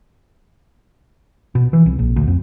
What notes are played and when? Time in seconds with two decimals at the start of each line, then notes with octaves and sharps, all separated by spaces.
1.55 B2
1.73 E3
1.86 C2
1.99 A#1
2.16 D2
2.27 F2